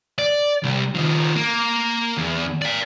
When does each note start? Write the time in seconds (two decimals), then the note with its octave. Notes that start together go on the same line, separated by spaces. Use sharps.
0.18 D5
0.63 C2
0.95 D#3 F3
1.36 A#3
2.17 E2
2.62 D5 F5